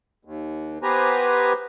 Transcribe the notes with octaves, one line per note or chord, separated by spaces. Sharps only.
D#2
B3 G4 B4 C5 G#5 A#5